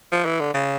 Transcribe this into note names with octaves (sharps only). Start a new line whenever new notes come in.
F3
E3
D3
C#3